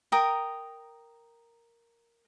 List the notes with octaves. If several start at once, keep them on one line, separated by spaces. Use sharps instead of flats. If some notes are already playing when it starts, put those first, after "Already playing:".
A#4 G5 A#5 D#6